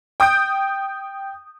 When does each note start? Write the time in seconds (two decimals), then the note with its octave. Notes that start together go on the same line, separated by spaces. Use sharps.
0.20 G5 D#6 G6 D7